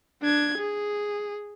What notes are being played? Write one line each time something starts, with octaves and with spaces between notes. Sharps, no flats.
D4 G#6
G#4